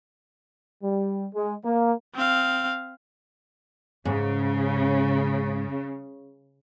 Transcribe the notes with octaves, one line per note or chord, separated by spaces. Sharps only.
G3
G#3
A#3
C4 F5
G#2 C#3